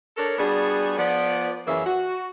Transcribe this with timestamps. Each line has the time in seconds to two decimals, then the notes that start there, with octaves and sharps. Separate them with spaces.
0.17 D4 A4 A#4 C#5
0.38 G3 B3 D4 F#4 G#4
0.97 F3 B3 D5
1.66 F#2 C#3 E3 A#3 C#4 E5
1.86 F#4